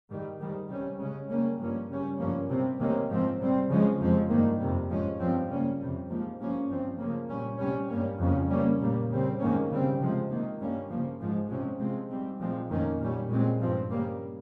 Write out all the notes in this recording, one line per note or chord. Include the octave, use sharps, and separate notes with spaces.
G#2 D#3 G3
G#2 D#3 G3
C3 G3 C#4
C#3 G#3 C#4
C#3 G3 A#3 C#4
G2 F3 A#3 C#4
C#3 G3 C#4
G2 F3 A#3 C#4
C3 G3 C4
C3 D#3 A#3 C#4
G#2 F3 C4
C3 G3 C4
C#3 F3 G#3 C#4
F2 C3 F3 G#3
G2 D#3 A#3
F2 C3 G3
G#2 F3 G#3 C#4
G2 F3 C4
C#3 G3 A#3 C#4
F2 C3 G3
G#2 F3 A#3
G2 F3 A#3 C#4
G2 F3 C4
C#3 F3 A#3
A#2 G3 C#4
C3 G3 C#4
G2 G3 A#3 C#4
F2 C#3 F3 A#3 C#4
C#3 G3 A#3 C#4
A#2 G3 A#3
C#3 G3 C4
G#2 D#3 A#3 C#4
C#3 G3 C4
C3 F3 G#3
C3 D#3 A#3
G2 G3 A#3 C#4
C#3 F3 A#3
G#2 F3 G#3
C3 F3 G#3 C#4
C3 F3 G#3 C4
G#2 G3 C4
A#2 F3 G#3 C4
F2 D#3 A#3 C#4
A#2 G3 C#4
A#2 G#3 C4
G2 F3 C4
C#3 G3 A#3